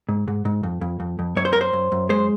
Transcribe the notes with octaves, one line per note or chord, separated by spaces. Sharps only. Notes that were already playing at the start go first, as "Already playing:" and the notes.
G#2
G#2
G#2
F2
F2
F2
F2
F#2 C#5
C5
F#2 A#4
C5
F#2
F#2
G#3 C5